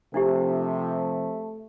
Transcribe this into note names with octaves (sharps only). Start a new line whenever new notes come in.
C3 F3 A3 D4 E4 G4